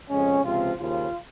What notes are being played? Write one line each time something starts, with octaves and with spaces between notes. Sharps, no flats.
F2 C#3 G#3 C#4
C#2 C3 F3 C4 F4
D#2 C#3 F3 F4